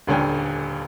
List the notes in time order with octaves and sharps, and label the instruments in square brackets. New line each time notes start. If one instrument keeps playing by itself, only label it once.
[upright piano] D#1 C#2 D3 C#4 G5 G#5